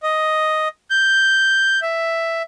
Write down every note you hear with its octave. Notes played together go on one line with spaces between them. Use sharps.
D#5
G6
E5